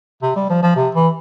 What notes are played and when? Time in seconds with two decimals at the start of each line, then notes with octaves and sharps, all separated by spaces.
0.22 C3
0.36 G3
0.50 F3
0.63 F3
0.76 C3
0.95 E3